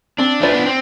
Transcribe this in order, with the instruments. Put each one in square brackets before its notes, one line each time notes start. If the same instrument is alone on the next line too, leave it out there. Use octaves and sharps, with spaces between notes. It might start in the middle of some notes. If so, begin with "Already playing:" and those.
[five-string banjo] C4 [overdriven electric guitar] D4
[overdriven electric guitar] A3 [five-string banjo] F4 B4 D5
[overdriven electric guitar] B3
C4